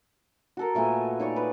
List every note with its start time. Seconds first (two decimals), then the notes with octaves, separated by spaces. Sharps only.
0.57 F#4 A4 A#4
0.75 A#2 A3 B3 G#5
1.19 D#4 C#5 D5 C#6
1.36 B4